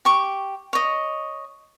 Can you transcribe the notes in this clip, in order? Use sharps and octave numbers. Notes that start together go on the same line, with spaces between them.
G4 C#6 D6
C#5 D#5